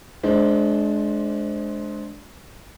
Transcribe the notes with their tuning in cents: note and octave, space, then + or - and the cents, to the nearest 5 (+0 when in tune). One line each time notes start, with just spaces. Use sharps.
G#3 +30 D4 +0 C5 +5